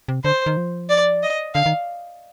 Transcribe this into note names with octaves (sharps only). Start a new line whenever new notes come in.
C3
D3 C5
D#3
F3
D5
D#5
D3 F5
D#3